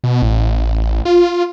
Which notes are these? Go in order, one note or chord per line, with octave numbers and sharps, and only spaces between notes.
B2
A1
F4